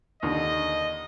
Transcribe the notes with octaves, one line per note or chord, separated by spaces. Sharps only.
D#2 D3 D#5